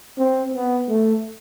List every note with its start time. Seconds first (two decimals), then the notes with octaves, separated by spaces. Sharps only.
0.18 C4
0.54 B3
0.89 A3